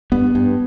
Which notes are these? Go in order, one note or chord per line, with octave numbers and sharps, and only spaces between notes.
G2 B3
G2